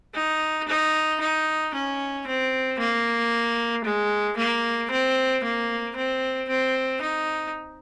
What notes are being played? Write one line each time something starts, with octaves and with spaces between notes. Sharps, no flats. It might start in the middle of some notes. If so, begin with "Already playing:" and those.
D#4
D#4
D#4
C#4
C4
A#3
G#3
A#3
C4
A#3
C4
C4
D#4